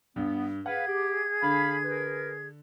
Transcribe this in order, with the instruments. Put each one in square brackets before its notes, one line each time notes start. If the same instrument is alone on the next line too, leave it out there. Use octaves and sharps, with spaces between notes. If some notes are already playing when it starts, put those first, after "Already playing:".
[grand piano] G2 [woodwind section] B3
[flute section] G#4 G#6 [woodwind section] B4 F5 [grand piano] F#5
[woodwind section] G4
[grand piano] D3 [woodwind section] F5 B5
[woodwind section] A#4 B4